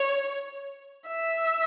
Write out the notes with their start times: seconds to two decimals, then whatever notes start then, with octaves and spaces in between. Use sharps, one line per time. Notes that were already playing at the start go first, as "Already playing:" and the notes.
Already playing: C#5
1.07 E5